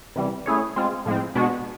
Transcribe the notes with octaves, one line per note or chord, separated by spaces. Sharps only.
C3 E3 G3
A3 C#4 E4 G#4 C#5
G#3 C4 F4
A2 F3 G#3 C4
B2 G#3 B3 D4 F#4